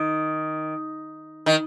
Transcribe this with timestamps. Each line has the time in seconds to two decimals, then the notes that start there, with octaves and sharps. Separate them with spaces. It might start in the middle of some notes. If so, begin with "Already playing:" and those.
Already playing: D#3
1.46 D#3